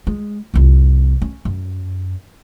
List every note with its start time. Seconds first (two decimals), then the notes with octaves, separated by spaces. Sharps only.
0.07 G#3
0.54 C2 F2
1.22 C#4
1.45 F#2